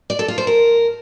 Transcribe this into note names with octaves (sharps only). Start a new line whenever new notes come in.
D5
A4
F4
C5
A#4